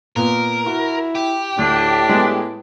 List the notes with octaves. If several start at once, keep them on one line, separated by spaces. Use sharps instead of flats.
A#2 B3 A#4
E4 F#4
G4
D2 A2 D4
G#3 B3